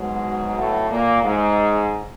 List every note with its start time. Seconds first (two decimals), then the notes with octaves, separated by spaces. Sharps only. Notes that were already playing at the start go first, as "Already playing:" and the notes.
Already playing: G#2 B2 F#3 G#3
0.57 A2 A3
0.90 A#2 A#3
1.23 G#2 G#3